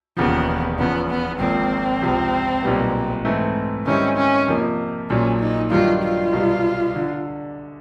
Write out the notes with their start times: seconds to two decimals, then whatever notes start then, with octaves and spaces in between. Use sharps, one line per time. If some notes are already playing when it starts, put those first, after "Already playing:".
0.17 E1 D#2 C#3 F3 B3
0.78 E2 C#3 F3 B3
1.10 B3
1.40 G#1 G#2 F3 A#3 C4
2.02 C#2 C3 F3
2.63 B1 A#2 G3 B3
3.25 G#2 E3 A3 C4
3.86 G#2 D#3 G3 C4 C#4 E4
4.17 C#4
4.47 F2 C3 F3 A#3
5.10 A#1 A#2 F#3 C#4
5.40 D#4
5.71 G2 D#3 F#3 F4
6.02 F4
6.32 C2 B2 G3
6.96 D3